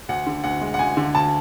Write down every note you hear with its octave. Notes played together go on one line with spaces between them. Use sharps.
D2 F#5
D3
D2 F#5
G#3
F#5
D2 G#5
D3
D2 A5